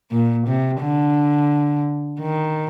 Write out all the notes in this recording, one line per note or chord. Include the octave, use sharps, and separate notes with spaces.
A#2
C3
D3
D#3